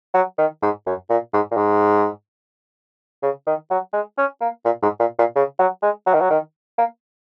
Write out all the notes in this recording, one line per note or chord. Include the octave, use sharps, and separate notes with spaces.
F#3
D#3
G#2
F#2
A#2
G#2
A#2
G#2
C#3
D#3
F#3
G#3
C#4
A#3
A#2
G#2
A#2
A#2
C#3
F#3
G#3
F#3
D#3
F#3
D#3
A#3